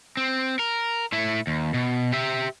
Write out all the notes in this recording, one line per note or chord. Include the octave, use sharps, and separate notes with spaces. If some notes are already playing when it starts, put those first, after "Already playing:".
C4
A#4
A2 E4
D#2
B2
G4 E5